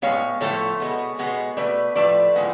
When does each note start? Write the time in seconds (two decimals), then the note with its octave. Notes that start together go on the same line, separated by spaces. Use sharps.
0.02 A2 G#3 B3 C#5 F5
0.41 A2 F3 A3 A4 C#5
0.80 B2 G#3 B3
1.19 B2 G#3 B3
1.57 B2 A3 B4 D5
1.96 A2 F3 A3 B4 D5
2.35 A2 F3 G#3 B3